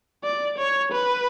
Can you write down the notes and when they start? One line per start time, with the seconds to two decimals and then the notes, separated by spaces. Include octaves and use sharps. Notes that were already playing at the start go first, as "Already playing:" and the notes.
0.24 D5
0.58 C#5
0.92 B4